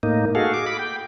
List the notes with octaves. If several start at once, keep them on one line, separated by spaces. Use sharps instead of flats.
A2 A#3 D#4
F#4 G#4 A4 F5
G#4 D6
B5 D6
G5